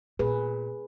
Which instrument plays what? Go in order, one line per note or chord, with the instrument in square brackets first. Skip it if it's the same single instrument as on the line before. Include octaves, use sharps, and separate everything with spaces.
[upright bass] A#2 [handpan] G#4 B4